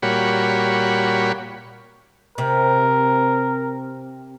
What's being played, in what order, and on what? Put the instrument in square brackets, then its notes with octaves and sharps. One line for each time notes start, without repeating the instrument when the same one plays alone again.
[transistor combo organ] A#2 G3 F#4 C#5 B5
[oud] C3 [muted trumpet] A#4